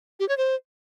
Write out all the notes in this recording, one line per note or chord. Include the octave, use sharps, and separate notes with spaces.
G4
C#5
C5